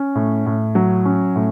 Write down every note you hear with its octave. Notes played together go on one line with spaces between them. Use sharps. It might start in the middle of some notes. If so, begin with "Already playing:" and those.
Already playing: C#4
A2
A2
F#3
C#4
A2